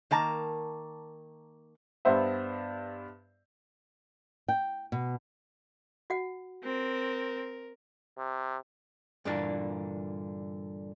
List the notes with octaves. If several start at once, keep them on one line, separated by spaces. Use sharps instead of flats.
D#3 A#3 A5 A#5
G2 B3 C5 E5
G5
B2
F#4 F#5
C4 A#4
C3
G2 A#2 D3 E3 A#3 D4